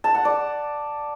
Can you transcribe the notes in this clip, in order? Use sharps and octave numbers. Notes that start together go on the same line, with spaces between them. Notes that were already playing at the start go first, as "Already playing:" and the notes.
A5
F#5
D5